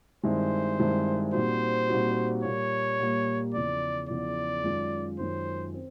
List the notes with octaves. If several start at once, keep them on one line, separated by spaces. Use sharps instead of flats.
G2 D#3 G#3 C4 E4 C5
G2 D#3 G#3 C4 E4
A#2 G3 C4 D#4 F#4 C5
A#2 G3 C4 D#4 F#4
A#2 G3 A#3 C#5
A#2 G3 A#3
E2 C#3 F3 D5
E2 C#3 F3 D5
F#2 D#3 G#3 C#4 F4
F#2 D#3 G#3 C#4 F4 C5
C4